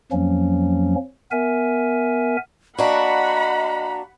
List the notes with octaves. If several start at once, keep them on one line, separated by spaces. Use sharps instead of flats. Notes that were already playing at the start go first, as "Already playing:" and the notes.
F2 F3 F#3 A#3 C#4
B3 A#4 E5 G#5
A#3 D4 F#4 D#5 F#5 A#5 B5